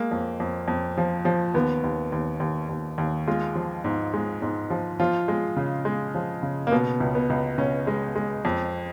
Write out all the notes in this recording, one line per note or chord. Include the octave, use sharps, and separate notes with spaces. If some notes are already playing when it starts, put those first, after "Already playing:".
Already playing: G#3 A#3
F2
F2
F2
F3
F3
D#2 B3
D#2
D#2
D#2
D#2
D#2
G#3 F4
F3
G#2
G#3
G#2
F3
F3 F4
G#3
C#3
G#3
F3
C#3
A#3
B2 B3
C#2
B3
C#2
C#2 C#4
G#3
G#3
F2